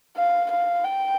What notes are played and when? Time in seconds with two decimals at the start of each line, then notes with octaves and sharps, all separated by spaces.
0.17 F5
0.51 F5
0.84 G5